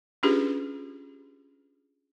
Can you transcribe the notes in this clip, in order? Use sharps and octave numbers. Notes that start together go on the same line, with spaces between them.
C#4 D4 F4 G4 G#4 B4